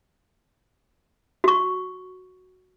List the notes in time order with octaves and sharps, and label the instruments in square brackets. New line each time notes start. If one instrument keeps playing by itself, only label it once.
[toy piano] F#4 C#6